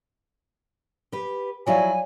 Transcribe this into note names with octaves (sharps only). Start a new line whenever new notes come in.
G4 B4
F3 F#3 E4 C#5 D5 F5 G#5